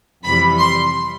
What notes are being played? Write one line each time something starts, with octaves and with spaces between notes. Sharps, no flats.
F2 C3 E3 G3 B5
C6